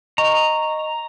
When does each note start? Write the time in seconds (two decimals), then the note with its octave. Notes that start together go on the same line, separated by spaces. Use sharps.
0.18 D#5 A#5 C#6